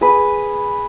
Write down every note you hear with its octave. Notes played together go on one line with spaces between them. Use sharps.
G#4 B4